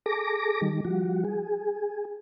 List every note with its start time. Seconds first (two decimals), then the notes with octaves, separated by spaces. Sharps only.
0.06 G#4 A4 D6 A#6
0.61 D#3 G3
0.85 F3 G3 F#4
1.25 G#4